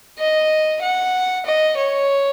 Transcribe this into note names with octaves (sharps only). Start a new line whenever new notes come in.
D#5
F#5
D#5
C#5